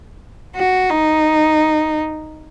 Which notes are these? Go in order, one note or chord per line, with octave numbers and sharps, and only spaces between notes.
F#4
D#4